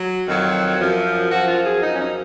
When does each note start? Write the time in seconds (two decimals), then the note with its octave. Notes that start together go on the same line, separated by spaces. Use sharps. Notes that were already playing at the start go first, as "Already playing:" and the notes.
Already playing: F#3
0.27 F2 D#3 F#3
0.79 F#2 F3
1.31 F#2 F3 F#4
1.48 F4
1.66 G#4
1.82 F#2 F3 D#4
1.94 C#4
2.00 D#4